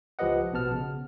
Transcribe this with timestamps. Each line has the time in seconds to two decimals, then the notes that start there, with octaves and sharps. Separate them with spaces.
0.19 C#2 F3 G4 B4 D#5 F#5
0.52 A#1 B2 B3 A5 F6
0.72 C#3